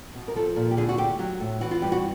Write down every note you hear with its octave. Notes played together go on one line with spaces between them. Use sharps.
B2
A#4
F3 A4
A#2
G4
D3 G#4
F#4
A3 G4
F#3
A2
E3 F#4
F4
G2 G4
F#4